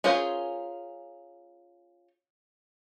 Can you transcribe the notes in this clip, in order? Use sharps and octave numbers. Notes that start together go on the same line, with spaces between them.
C#4 F4 G#4 A#4 C5